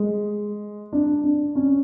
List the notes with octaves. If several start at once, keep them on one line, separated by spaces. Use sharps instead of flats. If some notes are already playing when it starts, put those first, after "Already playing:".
Already playing: G#3
D4
D4
C#4